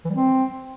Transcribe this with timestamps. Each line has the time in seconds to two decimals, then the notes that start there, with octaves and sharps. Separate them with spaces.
0.05 E3
0.10 G3
0.15 C4